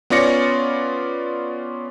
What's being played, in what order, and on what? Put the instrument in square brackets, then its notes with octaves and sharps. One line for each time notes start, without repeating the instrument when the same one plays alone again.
[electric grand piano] B3 C#4 F4 D5 A#6 C#7